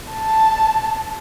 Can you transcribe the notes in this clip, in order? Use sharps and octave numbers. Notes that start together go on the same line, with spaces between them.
A5